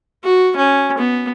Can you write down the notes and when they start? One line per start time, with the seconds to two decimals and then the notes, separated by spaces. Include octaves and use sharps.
0.24 F#4
0.56 C#4
0.98 B3